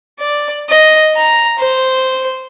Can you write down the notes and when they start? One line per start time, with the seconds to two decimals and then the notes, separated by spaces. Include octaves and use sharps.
0.19 D5
0.69 D#5
1.15 A#5
1.58 C5